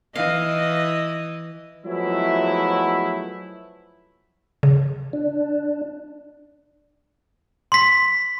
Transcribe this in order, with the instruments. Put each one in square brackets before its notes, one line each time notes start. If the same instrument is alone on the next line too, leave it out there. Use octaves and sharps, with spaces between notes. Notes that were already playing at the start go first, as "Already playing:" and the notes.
[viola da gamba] E3 D#5 [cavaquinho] F5
[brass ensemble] F3 F#3 G#3 A3 B3 E4
[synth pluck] C#3
[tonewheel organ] D4
[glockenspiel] C6 B6